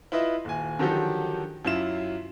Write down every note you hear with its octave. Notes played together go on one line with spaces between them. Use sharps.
E4 F4 B4 D#5 E5
D#1 G#5
D3 D#3 F3 F#3 G4 A4
F#2 F#3 E4 F4 E7